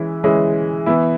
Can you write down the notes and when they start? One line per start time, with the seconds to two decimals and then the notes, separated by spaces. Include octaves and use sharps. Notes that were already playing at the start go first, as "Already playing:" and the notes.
Already playing: E3 G#3 C#4 E4
0.24 E3 G#3 C#4 E4
0.86 E3 B3 E4